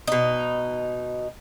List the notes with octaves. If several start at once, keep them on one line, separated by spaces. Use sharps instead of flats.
B2 D#4